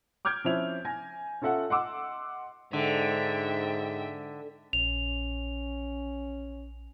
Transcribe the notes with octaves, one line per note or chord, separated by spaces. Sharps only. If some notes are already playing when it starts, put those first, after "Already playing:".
D6 F6 G6 G#6 D7
F3 C4 C#4 E4 F7
G#5 G#6 A#6
C#4 F4 A4 E5 F#5
D#5 F#5 C6 D6 E6
G#2 D3 E5 G5
A#1 C#4 F7